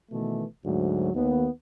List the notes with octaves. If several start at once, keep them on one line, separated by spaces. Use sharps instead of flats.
B2 D#3 E3 A3
D2 G#2 F#3
D#2 B3